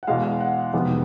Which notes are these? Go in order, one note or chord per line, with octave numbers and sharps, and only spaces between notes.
F#5
E2 B2 G#3 F5
F#5
F2 C3 D#3 G#3 B3